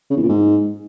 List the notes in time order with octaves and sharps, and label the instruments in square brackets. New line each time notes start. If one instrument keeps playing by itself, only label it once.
[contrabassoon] C#3
E2
A#2
G#2